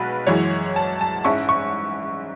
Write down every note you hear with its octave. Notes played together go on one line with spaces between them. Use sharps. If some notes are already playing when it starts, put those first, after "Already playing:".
Already playing: B1 B2 G#3 B4
F#2 E3 G#3 C#5
A5
A5
G#2 G#3 C#4 E4 C#6
C#6